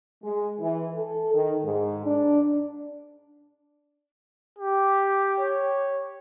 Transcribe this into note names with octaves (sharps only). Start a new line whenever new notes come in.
G#3
E3
A4
D#3
G#2
D4
G4
C#5